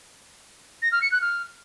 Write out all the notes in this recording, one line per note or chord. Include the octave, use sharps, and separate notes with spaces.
A#6
F6
C#7
F#6
F6